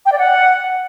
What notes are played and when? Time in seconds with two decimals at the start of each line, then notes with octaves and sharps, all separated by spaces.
0.06 G5
0.12 D5
0.18 F#5